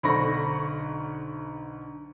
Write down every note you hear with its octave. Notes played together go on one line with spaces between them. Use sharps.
B1 D3 C5 B5 C#6 A#6